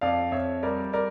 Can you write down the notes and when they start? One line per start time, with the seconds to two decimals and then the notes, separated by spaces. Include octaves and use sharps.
0.01 F2 D5 F5
0.32 F2 C#5 E5
0.63 G3 A#4 D5
0.93 A#4 D5